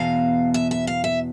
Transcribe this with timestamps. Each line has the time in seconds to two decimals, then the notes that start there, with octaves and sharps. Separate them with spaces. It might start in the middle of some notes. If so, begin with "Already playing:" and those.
Already playing: E2 B2 F5
0.54 E5
0.71 E5
0.87 F5
1.04 E5